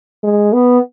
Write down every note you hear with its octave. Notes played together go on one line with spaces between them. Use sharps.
G#3
B3